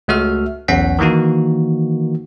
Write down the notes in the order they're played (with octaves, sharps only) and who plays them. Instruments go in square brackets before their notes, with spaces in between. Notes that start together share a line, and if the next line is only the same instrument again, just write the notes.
[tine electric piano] C#2 A3 F#4 E5 F6
B1 E2 C#4 F#5 B6
D#3 E3 A#3 D#4 F#4